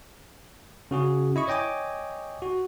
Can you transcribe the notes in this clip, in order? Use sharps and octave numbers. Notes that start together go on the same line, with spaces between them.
C#3 F#4 G#4
E4 D#5 C#6
C#5 D#5 G5 G#5 D6
F#4